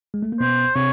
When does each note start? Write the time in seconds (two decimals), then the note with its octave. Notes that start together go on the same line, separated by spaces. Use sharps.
0.14 G#3
0.23 A3
0.32 A#3
0.40 B2 B3 C5
0.75 C3 C4 C#5